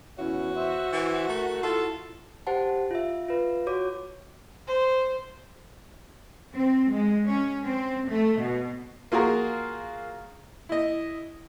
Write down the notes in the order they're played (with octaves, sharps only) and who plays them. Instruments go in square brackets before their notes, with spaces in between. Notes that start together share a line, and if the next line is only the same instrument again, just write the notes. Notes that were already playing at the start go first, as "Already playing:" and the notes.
[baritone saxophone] E2 [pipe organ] C#4 E4 [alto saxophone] F#4
[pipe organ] C5 [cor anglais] E5
[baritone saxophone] E3
[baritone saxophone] A3 [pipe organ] A#4
[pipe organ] E4 [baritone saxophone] F4 [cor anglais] A4
[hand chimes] G4 C5 F#5 A5
F4 E5
F4 B4
F#4 C#5 D6
[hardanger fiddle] C5
[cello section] C4
G#3
C#4
C4
A3
B2
[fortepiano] A#3 F4 F#4 G#4 A#4
E4 D#5